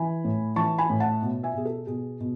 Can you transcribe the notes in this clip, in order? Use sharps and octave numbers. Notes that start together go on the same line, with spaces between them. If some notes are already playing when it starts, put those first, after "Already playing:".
Already playing: E3 G#5 B5
A2
E3 A5 C#6
G#5 B5
A2
F#5 A5
B2
E5 G#5
B2 G#4
A4
B2 G#4
B2